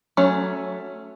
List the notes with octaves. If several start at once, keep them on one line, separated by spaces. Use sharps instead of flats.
F#3 A3 C#4